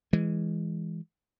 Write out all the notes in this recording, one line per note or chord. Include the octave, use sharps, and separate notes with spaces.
E3 G#3